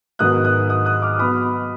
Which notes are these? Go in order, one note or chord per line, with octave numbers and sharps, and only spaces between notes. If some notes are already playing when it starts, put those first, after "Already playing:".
G#2 D#3 F#3 B3 D#6 F#6
D#6 F#6
D#6 F#6
D#6 F#6
D6 F6
B2 F#3 B3 B5 D#6